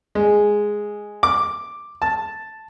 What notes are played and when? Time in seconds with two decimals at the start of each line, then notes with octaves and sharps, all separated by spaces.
0.15 G#3
1.23 D6
2.02 A5